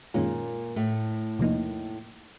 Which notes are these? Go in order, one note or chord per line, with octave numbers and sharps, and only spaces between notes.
F#2 A#2 D#3 G#3 A#3 C#4 F4
A2 A3
E2 C3 F3 A#3 D#4